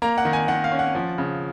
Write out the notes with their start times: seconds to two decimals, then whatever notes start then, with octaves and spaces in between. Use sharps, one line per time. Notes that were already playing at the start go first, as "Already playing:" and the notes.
0.02 A#3 A#5
0.18 F#5
0.25 D#3
0.33 G#5
0.48 D#3 F#5
0.64 F5
0.72 C#4
0.79 F#5
0.95 F3
1.18 C#3